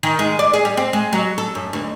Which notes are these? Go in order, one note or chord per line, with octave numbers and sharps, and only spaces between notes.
D#3
G#3
D5
G#4
G3
C4
G#3
F#3
A4
F#2
D2